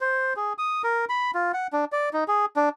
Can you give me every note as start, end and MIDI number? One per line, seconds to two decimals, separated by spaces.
0.01 0.34 72
0.36 0.53 68
0.58 0.82 87
0.84 1.05 70
1.09 1.31 83
1.35 1.52 65
1.54 1.67 78
1.73 1.85 62
1.92 2.09 74
2.13 2.24 63
2.28 2.46 68
2.56 2.69 62